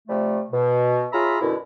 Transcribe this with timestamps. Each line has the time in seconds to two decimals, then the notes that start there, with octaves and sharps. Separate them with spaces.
0.08 C3 F3 G3 A3
0.52 B2
1.12 F4 G#4 C#5 E5 A#5 B5
1.41 F#2 B2 D3 E4